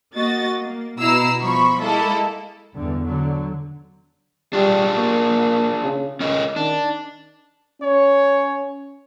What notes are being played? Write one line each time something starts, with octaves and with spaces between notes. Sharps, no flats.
A#3 F#4 D#5 A6
A#3
B2 E4 A#5 E6 C7
F3 B5 C#6
G#3 A#3 E4 A4
E2 G2 D3
D3 F#3
G3 D4 F4 G#4
A#3
C#3
C#2 C#4 A#4 D#5
D#3 D4
C#4 C#5